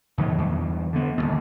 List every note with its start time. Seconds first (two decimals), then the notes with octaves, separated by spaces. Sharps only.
0.18 E2 D#3 F#3 A3
0.38 E2 G2
0.93 D3 B3
1.18 D1 G#1 D#2